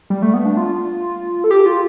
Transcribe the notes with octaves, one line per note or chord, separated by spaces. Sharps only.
G3
A3
B3
D4
F4
A4
G4
F4